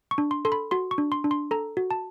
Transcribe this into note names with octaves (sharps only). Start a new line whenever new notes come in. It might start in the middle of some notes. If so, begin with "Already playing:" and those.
C#6
D4
C6
A4 C6
B5
F#4 C6
C#6
D4
C6
D4
C6
A4 A#5
F#4
A5